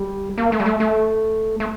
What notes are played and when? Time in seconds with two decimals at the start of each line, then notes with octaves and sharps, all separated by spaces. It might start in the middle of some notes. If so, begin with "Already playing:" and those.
Already playing: G3
0.38 A#3
0.52 A3
0.60 G3
0.66 A3
0.80 A3
1.60 A3